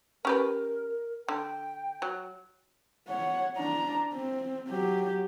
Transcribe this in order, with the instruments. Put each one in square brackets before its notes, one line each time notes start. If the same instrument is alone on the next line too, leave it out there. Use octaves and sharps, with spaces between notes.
[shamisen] C#4 G4 B4 [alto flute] A#4
[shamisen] D3 [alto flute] G5
[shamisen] F#3
[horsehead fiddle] C#5 F#5
D4 A#5
C4
F#3 G4